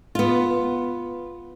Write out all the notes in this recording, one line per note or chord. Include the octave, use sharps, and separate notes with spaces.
B3 F4